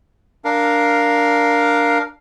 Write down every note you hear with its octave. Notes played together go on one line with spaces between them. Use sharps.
D4 A#4 F5